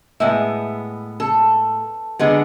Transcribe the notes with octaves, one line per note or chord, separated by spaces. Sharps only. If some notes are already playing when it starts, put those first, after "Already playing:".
A2 G#3 B3 E5
A4
D3 G#3 B3